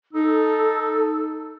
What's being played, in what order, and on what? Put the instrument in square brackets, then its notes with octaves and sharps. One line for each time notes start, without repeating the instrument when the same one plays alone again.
[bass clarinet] D#4 [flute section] A4 E6